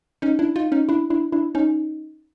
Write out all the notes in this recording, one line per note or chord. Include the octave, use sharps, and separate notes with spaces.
C#4 D#4
D4 E4
D#4 F4
C#4 D#4
D4 E4
D4 E4
D4 E4
C#4 D#4